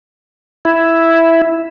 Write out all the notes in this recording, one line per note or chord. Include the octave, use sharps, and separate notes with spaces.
E4